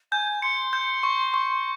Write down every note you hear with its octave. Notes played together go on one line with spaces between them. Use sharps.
G#5 G6
C6 C#7
G6
C#6
C#6